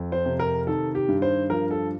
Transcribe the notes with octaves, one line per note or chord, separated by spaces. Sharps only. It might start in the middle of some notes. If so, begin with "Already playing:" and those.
Already playing: F2
C5
C3
A#4
D#3 A4
G4
G2
C5
F3 A#4
A4